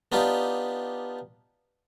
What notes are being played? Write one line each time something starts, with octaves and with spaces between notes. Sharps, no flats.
B3 D4 D#4 F4 G4